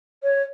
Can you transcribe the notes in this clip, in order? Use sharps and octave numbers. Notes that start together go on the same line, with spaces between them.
C#5